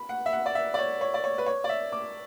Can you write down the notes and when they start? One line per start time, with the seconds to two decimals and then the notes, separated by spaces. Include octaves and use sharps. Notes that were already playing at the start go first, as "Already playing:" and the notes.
Already playing: B5
0.09 F#5
0.26 E5
0.33 F#5
0.46 D5
0.55 E5
0.74 D5
0.79 C#5
1.01 C#5
1.14 D5
1.24 C#5
1.38 B4
1.46 C#5
1.64 D5
1.69 E5
1.92 D6